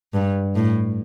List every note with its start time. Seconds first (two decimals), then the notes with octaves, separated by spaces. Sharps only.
0.14 G2
0.56 A2